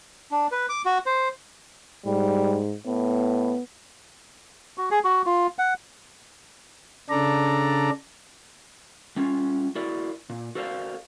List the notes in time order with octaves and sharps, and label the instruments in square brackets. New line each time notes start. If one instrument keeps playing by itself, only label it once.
[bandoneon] D4
B4
D6
F#4
C5
[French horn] G#2 [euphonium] G3
[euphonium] A2 [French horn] B3
[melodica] F#4
G#4
F#4
F4
F#5
[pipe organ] C#3 D4 A4 D5 A#5
[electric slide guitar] G3 C#4 F4
E4 F#4 A#4 D5
A#2
F#4 A4 A#4 C5 D5 F5